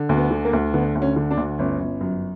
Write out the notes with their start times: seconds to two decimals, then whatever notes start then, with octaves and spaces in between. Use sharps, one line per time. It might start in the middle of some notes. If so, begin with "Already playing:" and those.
Already playing: D3
0.09 D2
0.17 B3
0.31 D3
0.45 A#3
0.53 D2
0.74 D3 B3
0.95 D2
1.02 C#4
1.16 D3
1.31 D4
1.37 D2
1.59 G1 C#4
1.80 G1
2.01 F#2